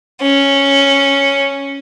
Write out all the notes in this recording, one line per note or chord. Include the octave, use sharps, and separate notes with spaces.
C#4